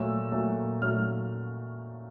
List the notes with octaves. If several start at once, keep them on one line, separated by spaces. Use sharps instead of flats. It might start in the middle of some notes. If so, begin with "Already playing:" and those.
Already playing: A#2 F#3 A3 E6
A#2 F#3 A3
A#2 F#3 A3 F6